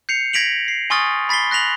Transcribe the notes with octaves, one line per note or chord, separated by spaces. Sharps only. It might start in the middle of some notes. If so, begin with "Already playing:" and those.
G6 C7 C#7 F7
G#6 A#6 B6 D7 F7 F#7
C7
G#5 C6 C#6 D#6 F6 A6
B5 A6 B6 C7 G7
F#6 A#6 B6 F7 F#7